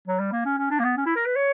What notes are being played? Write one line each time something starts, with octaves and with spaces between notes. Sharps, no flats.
F#3
G3
A#3
C#4
C#4
D4
A#3
B3
C#4
E4
A#4
B4
C#5